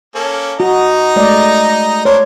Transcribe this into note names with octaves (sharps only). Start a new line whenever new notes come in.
A#3 C#4 A4
D#4 F#4 D#5 A#5
G#3 A3 D5
D4 A#4 C5 C#5